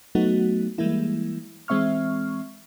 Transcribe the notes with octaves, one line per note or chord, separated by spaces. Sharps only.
F#3 A3 B3 D#4 F#4
E3 G3 G#3 A#3 E4
E3 G#3 C4 E5 C#6 F6